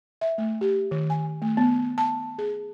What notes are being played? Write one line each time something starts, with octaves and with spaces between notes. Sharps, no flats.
E5
A3
G4
D#3
G#5
A3
B3
A5
G#4